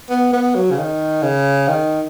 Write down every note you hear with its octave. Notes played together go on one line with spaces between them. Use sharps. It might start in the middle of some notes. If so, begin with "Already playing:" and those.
B3
B3
F#3
C#3
D#3
C#3
D#3